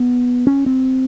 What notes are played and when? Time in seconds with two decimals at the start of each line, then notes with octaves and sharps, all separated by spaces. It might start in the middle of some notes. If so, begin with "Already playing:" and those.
Already playing: B3
0.47 C#4
0.66 C4